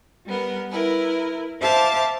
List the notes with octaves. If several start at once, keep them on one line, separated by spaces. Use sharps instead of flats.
G3 B3 A#4
E4 A#4 B4
C5 E5 F5 A5 D6